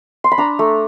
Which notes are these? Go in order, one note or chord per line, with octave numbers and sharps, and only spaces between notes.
C6
B5
D4 A#5
A3